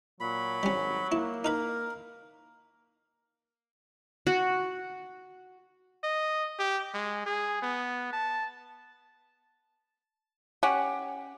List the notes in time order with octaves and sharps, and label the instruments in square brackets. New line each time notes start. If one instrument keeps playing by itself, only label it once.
[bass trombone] A#2 [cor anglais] F#3 [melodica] B5
[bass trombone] G#1 [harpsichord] G3 C#4
[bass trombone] A#3 [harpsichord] E4
[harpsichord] D#4 B4 B5 [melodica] A#4
[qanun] F#4
[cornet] D#5
G4
G#3
G#4
B3
A5
[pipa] C#4 G4 F#5